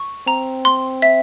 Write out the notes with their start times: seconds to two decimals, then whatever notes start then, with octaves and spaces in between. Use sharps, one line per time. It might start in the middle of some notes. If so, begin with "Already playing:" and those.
Already playing: C#6
0.26 C4 A#5
0.65 C6
1.02 E5